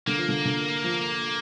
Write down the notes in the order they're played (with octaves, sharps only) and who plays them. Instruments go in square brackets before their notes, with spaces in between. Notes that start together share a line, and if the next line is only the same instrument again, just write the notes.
[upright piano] D3 [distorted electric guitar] A#3
[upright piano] F3
D3
D3
F3